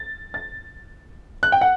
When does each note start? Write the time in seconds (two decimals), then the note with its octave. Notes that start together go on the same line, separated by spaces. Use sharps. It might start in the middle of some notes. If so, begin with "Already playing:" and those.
Already playing: A6
0.34 A6
1.43 F#6
1.52 G5
1.61 F#5